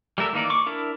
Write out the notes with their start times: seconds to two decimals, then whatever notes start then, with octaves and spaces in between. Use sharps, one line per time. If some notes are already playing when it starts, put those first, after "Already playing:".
0.18 G3 A3 A#4 E5
0.33 D#3 E3 A#3 D#4 D5
0.50 C#6 D6
0.66 D4 E4 A#4